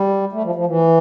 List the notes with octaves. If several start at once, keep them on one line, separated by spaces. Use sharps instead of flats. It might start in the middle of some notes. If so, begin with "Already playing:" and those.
Already playing: G3
A3
F3
F3
E3